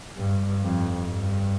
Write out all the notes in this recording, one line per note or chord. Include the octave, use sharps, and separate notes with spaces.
G2
F2
G2